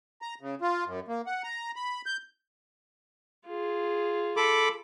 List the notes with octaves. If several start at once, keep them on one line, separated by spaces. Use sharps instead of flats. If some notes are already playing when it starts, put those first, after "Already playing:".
A#5
C#3
F4
F#2
A#3
F#5
A#5
B5
G6
F4 G#4
A4 B5 D6